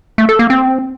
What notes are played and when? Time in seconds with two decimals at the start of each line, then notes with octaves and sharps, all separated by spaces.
0.18 A3
0.29 A4
0.39 A#3
0.50 C4